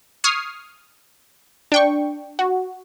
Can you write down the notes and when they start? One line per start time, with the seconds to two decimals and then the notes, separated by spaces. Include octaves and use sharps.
0.24 C#6 D#6 F6 G#6 C7
1.72 D4 G5 C#6
2.39 F#4